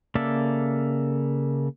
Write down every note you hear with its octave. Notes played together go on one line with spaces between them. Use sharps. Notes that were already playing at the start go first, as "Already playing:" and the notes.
C#3 A#3 A4 D5 E5